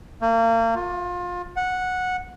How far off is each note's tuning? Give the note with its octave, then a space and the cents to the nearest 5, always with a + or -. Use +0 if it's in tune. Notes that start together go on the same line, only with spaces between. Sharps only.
A#3 -35
F4 +25
F#5 -10